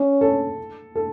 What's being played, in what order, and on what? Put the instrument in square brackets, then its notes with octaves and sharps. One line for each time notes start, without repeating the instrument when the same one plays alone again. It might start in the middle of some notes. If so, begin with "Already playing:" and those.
Already playing: [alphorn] C#4
[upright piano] A4
A4